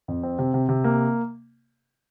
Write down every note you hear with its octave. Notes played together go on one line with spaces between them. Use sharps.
F2
C4
C3
C3
C3
A#3